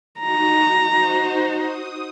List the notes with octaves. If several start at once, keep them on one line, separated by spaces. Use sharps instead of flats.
D#4 F#4 A#5
D#4 F#4 C5
D#6